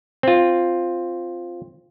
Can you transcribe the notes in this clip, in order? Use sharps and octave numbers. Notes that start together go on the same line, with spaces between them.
C4 F4